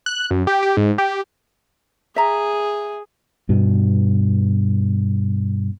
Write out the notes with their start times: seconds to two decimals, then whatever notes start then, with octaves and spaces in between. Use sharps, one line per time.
0.06 F#6
0.30 F#2
0.47 G4
0.62 G4
0.77 G#2
0.98 G4
2.16 G#4 E5 A#5
3.49 G2 B2